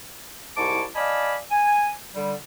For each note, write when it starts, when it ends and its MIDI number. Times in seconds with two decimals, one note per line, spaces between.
0.57 0.83 36
0.57 0.83 44
0.57 0.83 64
0.57 0.83 81
0.57 0.83 85
0.57 0.83 86
0.95 1.36 74
0.95 1.36 75
0.95 1.36 77
0.95 1.36 80
0.95 1.36 81
0.95 1.36 83
1.51 1.90 80
2.15 2.34 50
2.15 2.34 55